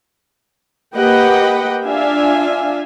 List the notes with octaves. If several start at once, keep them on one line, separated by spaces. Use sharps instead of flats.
A#3 G4 B4 D#5 F#5 G5
D4 F4 E5 F5 G#5